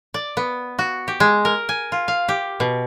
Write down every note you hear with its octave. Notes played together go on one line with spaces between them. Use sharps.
D5
B3
F#4
G4
G#3
A#4
G#5
F4
F5
G4
B2